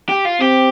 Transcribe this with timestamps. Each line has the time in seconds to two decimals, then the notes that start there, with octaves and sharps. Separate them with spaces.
0.09 G4
0.25 F4
0.40 C4 G4